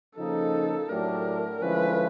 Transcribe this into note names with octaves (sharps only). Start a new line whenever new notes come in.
C#3 F3 A#3 D#4 A4
A2 F#3 A3 D4 G4 A#4
D3 F3 G#3 C#4 E4 B4